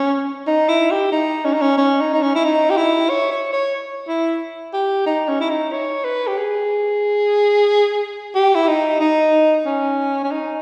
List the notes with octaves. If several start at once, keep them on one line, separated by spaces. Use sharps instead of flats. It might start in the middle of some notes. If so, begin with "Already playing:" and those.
Already playing: C#4
D#4
E4
G4
D#4
C#4
D#4
C#4
C#4
D#4
D#4
C#4
E4
D#4
G4
E4
C#5
C#5
C#5
E4
G4
D#4
C#4
E4
D#4
C#5
B4
G4
G#4
G4
E4
D#4
D#4
C#4
C#4
D#4